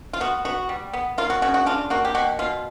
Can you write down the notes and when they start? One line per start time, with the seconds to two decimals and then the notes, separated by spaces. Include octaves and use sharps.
0.13 F4
0.21 B3 F#4
0.45 B3 F#4
0.69 G3
0.93 B3
1.18 A#3 F4
1.30 F#4
1.42 C#3 F#4
1.54 F#4
1.66 D4 F4
1.90 A#3 F#4
2.05 G4
2.15 B2 F#4
2.39 B2 F4